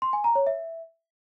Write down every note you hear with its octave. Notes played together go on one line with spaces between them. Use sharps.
C6
G#5
A#5
C#5
E5